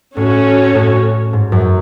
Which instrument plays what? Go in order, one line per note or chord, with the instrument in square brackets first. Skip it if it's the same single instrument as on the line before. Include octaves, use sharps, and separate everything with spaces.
[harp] A2 [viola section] C#4 F#4 A4 C#5
[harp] A2
G#2
F#2